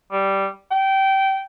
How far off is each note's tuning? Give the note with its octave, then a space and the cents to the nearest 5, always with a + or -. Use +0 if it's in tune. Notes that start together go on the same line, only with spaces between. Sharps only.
G3 -5
G5 -20